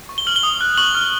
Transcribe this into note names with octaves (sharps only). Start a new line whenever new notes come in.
C#6
G7
F6 F#7
G7
D#6
F#6
C#6 F#7
F6